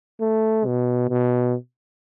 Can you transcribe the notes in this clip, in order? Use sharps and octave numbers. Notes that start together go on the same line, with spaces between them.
A3
B2
B2